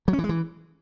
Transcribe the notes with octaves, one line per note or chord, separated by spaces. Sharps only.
F#3
C#4
E3
G#3
E3